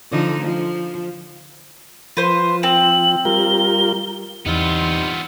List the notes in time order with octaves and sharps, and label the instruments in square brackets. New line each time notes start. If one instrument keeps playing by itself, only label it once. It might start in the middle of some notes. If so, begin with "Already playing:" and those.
[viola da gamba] D3 F3 D#4
F3
[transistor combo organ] F3 [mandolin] B4 C5
[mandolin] C4 [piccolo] F#7
[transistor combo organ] G3 F4 A#4 [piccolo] G7
[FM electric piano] E2 E3 [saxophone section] G3 C4 D#4 [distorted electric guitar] B3 F4